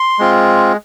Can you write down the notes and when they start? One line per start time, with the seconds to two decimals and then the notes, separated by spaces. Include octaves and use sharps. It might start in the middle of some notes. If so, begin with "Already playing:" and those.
Already playing: C6
0.19 G#3 C4 F4